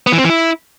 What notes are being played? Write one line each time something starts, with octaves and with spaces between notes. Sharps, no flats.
B3
E3
C4
E3
E4